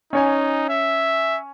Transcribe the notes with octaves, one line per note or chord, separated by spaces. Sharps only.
C#4 D#4 C#5 G#5
E5